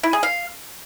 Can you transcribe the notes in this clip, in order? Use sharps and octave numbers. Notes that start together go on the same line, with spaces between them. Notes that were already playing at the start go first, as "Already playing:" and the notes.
E4
G#4
F5